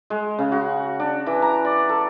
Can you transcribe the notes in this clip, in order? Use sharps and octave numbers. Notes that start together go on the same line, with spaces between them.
G#3
C#3
F#4
D4
E3
A#5
D5
A4